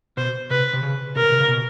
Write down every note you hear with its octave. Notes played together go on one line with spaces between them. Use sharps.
B2 C5
C3 B4
C3
C#3
C3 A#4
C#3
C3
C#3
B2